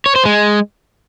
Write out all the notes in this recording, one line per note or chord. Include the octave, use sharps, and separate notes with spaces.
C#5
C5
G#3